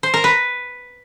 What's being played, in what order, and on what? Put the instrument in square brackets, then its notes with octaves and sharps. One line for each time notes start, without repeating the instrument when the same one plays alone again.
[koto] C5
A#4
B4